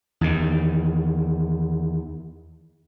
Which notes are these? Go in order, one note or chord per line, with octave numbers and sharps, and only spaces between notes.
E2 D#3